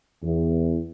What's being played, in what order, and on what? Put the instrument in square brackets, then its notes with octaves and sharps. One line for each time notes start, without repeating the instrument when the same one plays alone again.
[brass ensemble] E2